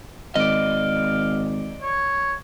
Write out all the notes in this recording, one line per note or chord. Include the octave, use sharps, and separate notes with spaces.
G#1 D5 D#5 F5
C#5